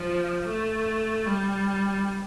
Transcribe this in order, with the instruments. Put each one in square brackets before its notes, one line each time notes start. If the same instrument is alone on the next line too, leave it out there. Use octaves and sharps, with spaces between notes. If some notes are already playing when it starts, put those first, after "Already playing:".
Already playing: [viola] F3
A3
G3